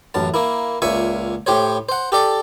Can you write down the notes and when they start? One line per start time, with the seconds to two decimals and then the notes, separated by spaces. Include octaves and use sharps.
0.14 A1 F#2 A5
0.34 A#3 E4
0.82 C#2 A#2 E5 G#5 C#6
1.46 A2 G4 C5 C#5
1.89 C5 F#5
2.12 G4 A4 D5 A5